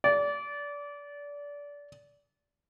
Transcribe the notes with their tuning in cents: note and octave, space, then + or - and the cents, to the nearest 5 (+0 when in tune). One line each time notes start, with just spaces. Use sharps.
D5 -25